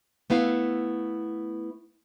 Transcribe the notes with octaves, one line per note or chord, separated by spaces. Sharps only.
A3 B3 E4 F5